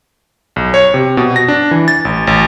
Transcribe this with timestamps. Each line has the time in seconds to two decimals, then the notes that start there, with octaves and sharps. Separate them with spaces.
0.56 B1
0.74 C#5
0.94 C3
1.17 B2
1.36 A#6
1.48 D4
1.71 E3
1.88 A6
2.05 A1
2.27 A1